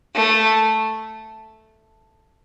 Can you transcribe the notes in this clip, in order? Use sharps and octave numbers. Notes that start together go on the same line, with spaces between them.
A3